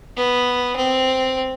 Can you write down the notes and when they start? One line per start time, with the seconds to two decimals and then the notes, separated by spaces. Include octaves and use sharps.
0.16 B3
0.76 C4